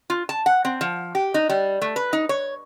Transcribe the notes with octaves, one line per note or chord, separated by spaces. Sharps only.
F4
A5
F#5
C4
F3
G4
D#4
G3
A3
B4
D#4
C#5